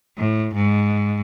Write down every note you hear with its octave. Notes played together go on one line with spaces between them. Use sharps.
A2
G#2